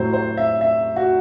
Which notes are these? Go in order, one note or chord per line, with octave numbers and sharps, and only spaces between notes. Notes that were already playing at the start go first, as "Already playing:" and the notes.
Already playing: A2 F#3 C5
C5
E5
E5
F#4